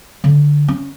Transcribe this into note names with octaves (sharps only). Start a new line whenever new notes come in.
D3
C#4